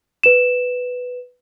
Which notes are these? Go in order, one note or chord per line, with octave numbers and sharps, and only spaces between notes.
B4 E7